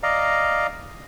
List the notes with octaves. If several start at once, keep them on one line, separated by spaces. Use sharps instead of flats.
D5 D#5 F5 A#5